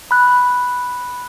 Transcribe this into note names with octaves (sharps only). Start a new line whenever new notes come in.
B5 F#6